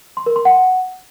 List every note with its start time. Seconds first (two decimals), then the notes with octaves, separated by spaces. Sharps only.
0.17 C6
0.26 A#4
0.36 C6
0.45 F#5